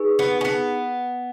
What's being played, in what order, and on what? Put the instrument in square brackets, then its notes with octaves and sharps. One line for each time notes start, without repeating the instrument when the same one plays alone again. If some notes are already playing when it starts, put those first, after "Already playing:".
Already playing: [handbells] D#4 G#4 B4
[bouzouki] B3
C#4
B3